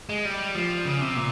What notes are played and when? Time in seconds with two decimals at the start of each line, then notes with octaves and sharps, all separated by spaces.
0.09 G#3
0.25 G3
0.55 F3
0.85 C#3
1.01 C3
1.16 A#2